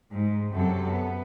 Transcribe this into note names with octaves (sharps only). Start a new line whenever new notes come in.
G#2
F#2 C3 F#3 A4
B3